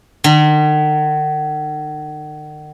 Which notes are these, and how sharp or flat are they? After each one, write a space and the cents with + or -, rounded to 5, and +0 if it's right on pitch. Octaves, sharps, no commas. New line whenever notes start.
D#3 -45